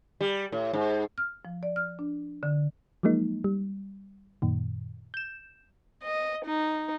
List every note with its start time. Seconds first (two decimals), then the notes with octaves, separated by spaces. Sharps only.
0.21 G3
0.52 A2
0.73 G#2
1.18 F6
1.45 F3
1.63 D5
1.76 F6
1.99 D4
2.43 D3
3.03 F3 F#3 G#3 A#3 D#4
3.44 G3
4.42 F#2 A#2 D#3
5.14 G6 E7
6.02 D#5
6.44 D#4